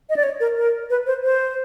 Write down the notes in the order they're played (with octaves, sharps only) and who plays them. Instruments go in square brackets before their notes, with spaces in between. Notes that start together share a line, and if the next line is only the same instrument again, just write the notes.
[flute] D#5
D5
C#5
A#4
A#4
B4
C5
C5